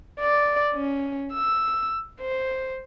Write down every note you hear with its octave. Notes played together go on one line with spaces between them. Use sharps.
D5
C#4
E6
C5